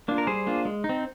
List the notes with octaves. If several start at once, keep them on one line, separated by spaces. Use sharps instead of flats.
A#3 D4 F4
A#4
G3 G#4 C5
A#3 D4 F4
G#3
D#4
C4